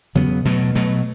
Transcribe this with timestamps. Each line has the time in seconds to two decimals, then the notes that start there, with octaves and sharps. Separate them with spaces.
0.15 E2 C#3 F#3 B3
0.45 B2 F#3 A3
0.75 B2 F#3 A3